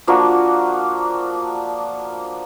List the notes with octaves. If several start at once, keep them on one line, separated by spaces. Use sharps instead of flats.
F3 A#3 D4 F#4